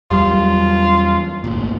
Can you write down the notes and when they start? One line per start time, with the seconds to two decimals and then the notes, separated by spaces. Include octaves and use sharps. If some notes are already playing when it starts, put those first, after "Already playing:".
0.11 E2 F#3 G3 F4
1.44 G#1 D2 A#2